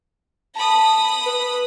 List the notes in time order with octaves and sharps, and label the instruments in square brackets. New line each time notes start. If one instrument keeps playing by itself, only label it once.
[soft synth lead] A5 [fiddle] B5 D#6
[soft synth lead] B4